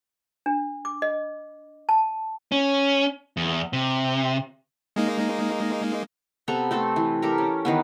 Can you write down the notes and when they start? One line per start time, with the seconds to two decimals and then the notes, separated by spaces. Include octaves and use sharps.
0.46 D4
0.85 D6
1.02 D#5
1.89 A5
2.52 C#4
3.37 E2
3.73 C3
4.96 G#3 A#3 D#4
6.48 C3 B3 A4 A#5
6.71 A3 C4 A4
6.96 E3
7.22 G4 A4 A#4
7.38 C#4
7.65 D#3 E3 B3